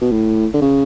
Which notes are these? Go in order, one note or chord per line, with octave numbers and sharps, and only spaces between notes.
B2
A2
D3
C#3